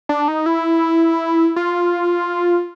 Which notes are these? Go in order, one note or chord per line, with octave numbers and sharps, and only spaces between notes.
D4
D#4
E4
F4